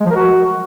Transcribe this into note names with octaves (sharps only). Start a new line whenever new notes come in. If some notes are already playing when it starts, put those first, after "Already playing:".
G#3
F3
A#4
F#4